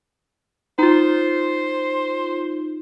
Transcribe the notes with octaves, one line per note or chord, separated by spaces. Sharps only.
D#4 F4 C5